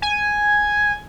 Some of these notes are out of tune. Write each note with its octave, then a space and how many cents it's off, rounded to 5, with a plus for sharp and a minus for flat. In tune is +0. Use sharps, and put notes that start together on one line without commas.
G#5 +0